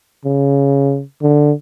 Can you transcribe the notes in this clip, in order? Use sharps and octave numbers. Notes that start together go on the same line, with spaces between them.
C#3
D3